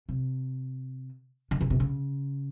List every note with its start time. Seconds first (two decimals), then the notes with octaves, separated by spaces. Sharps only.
0.09 C3
1.51 D3
1.61 C#3
1.70 C3
1.80 C#3